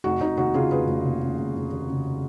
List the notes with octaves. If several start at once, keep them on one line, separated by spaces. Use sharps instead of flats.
F1 D#4 F#4
F1 D#4 F#4
D#2 D#4 F#4
C#3 F4 G#4
F1 G#4 B4
F1
D#2
C#3
F1
F1
D#2
C#3